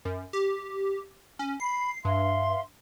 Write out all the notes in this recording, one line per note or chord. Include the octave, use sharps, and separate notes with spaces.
F#2
G4
C#4
B5 C7
G2 E5 F5 C6